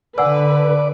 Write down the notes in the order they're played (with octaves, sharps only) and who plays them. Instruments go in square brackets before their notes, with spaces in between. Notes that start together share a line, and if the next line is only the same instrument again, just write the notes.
[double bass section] D3 [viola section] B4 [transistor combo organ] D5 [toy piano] F#5 G#5 E6